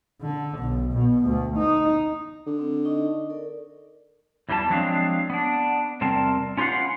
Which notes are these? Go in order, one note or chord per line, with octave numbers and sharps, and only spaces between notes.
D3
B1
B2
D2
D#4
D3
C4
D#4 D#5 C#6
A4 A#4 D5
E2 E3 G3 D4 A5
F3 F#3 G#3 C4 D4 F5
B3 D4
E2 C3 G3 C4 A#4 A5
C#4 F4 G4 B4 F5 F#5